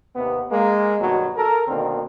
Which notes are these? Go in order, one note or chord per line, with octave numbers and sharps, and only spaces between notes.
D#2 C3 B3
G#3 A#3
G2 B2 D#3 F#3
A4 A#4
B2 D3 D#3 A#3 C4